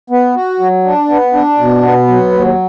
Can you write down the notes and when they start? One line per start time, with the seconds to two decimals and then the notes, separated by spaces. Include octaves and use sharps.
0.10 B3
0.35 F#4
0.59 F#3
0.84 D4
1.09 B3
1.33 D4
1.58 B2
1.83 B3
2.08 F#3
2.32 D#2